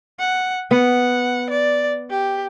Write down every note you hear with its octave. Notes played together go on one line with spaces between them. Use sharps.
F#5
B3 F#5
D5
G4